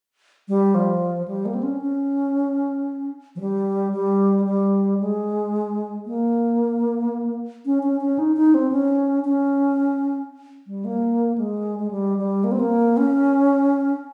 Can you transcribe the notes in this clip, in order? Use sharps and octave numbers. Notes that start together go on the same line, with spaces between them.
G3
F3
G3
A#3
C4
C#4
C#4
F3
G3
G3
G3
G#3
A#3
C#4
C#4
C#4
D#4
D#4
C4
C#4
C#4
G3
A#3
G#3
G#3
G3
G3
A#3
C4
A#3
C#4